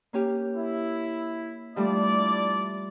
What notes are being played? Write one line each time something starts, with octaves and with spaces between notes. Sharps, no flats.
A#3 C#4 G4
E4
F3 G3 A3 D4 E4 D5